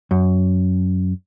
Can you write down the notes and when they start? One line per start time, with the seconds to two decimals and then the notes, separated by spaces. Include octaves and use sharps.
0.11 F#2